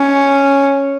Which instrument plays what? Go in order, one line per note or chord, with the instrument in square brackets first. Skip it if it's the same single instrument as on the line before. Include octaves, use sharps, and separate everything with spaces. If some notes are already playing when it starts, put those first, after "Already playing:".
Already playing: [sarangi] C#4